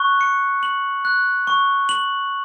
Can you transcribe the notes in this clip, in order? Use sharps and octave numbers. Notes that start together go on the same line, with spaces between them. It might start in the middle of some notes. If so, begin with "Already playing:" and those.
Already playing: C#6 F#6
C#7
F#7
F#6
C#6
F#7